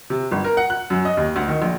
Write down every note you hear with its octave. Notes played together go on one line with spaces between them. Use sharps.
C3
G1
A#4
F#5
F#6
F#2
D#5
D#2
D2
D#3
A#1